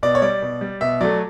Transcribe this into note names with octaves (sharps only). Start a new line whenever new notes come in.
B2 D5
C#5
G3 D5
B2
G3
B2 E5
F#3 A3 D5